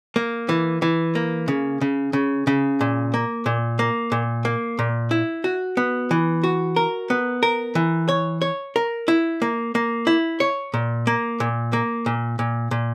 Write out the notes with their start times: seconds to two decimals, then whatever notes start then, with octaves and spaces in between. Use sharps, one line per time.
0.16 A#3
0.49 E3
0.82 E3
1.15 A#3
1.48 C#3
1.81 C#3
2.13 C#3
2.47 C#3
2.81 A#2
3.14 A#3
3.46 A#2
3.79 A#3
4.12 A#2
4.45 A#3
4.79 A#2
5.11 E4
5.44 F#4
5.77 B3
6.11 E3
6.43 F#4
6.76 A#4
7.10 B3
7.43 A#4
7.75 E3
8.09 C#5
8.42 C#5
8.76 A#4
9.08 E4
9.42 A#3
9.75 A#3
10.07 E4
10.40 C#5
10.74 A#2
11.07 A#3
11.40 A#2
11.73 A#3
12.06 A#2
12.39 A#2
12.71 A#2